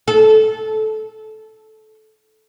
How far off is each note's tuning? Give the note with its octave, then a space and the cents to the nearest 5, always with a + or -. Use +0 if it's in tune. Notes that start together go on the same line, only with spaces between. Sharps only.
A4 -20